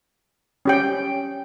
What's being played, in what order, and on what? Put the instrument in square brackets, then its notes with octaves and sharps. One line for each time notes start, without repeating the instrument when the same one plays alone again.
[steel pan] C#4 G4 G5